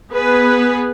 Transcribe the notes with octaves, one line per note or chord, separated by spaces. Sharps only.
B3 G#4 B4